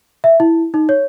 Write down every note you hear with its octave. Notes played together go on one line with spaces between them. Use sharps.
E5
E4
D#4
C#5